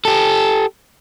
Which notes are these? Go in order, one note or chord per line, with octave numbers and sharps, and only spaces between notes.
G4 A4